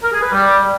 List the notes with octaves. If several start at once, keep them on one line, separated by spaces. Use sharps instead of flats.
A#4
G#4
B4
G3